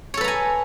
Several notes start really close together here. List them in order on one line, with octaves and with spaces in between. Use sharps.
C#5 A4 B4 A#5 G#5